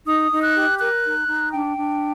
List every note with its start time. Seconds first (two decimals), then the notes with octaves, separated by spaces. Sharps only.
0.06 D#4 D#6
0.30 D#4
0.43 F#6
0.55 G4
0.80 A#4 F#6
1.05 D#4
1.29 D#4
1.53 D4 G5
1.77 D4